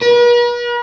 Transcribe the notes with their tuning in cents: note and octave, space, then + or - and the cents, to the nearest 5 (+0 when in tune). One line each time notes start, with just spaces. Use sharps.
B4 -45